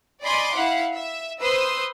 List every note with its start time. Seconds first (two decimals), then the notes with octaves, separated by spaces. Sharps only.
0.22 D5 D#5 G#5 B5 C6 D6
0.53 E4 F5 F#5 B5
0.93 E5
1.41 B4 C5 C6 D#6 E6